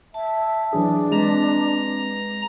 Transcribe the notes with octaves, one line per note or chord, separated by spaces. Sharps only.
E5 A5
E3 F#3 D4 G#4
G#3 C4 B4 A#5